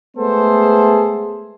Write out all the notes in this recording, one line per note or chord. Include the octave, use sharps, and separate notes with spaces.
G#3 A3 B3 G#4 A4 C5